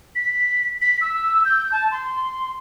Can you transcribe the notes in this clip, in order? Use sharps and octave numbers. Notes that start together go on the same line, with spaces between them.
B6
B6
E6
G6
A5
C6